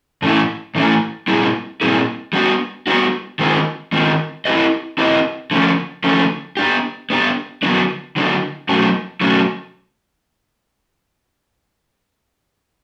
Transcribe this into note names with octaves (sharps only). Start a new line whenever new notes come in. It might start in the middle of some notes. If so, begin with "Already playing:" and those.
A2 E3 A3 C#4 E4
A2 E3 A3 C#4 E4
A#2 G3 C4 E4 G#4
A#2 G3 C4 E4 G#4
G3 B3 D4 F#4
G3 B3 D4 F#4
D#3 G#3 C4 F4
D#3 G#3 C4 F4
C4 E4 G4 B4 D#5
C4 E4 G4 B4 D#5
D3 F3 A3 C#4
D3 F3 A3 C#4
B3 D4 G4
B3 D4 G4
D3 F#3 B3 D4
D3 F#3 B3 D4
B2 F#3 A3 C#4 F#4
B2 F#3 A3 C#4 F#4